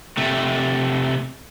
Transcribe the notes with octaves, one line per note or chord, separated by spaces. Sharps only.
C3 A3